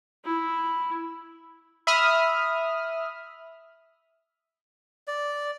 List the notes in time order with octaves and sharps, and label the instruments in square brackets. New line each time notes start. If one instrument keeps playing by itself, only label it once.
[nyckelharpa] E4
[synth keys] E5 B5 D#6 F6
[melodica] D5